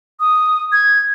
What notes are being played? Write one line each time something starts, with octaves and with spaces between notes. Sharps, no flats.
D#6
G#6